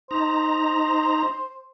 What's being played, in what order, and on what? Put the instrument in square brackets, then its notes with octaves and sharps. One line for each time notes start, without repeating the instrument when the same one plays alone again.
[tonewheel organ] D#4 A#5 [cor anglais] C5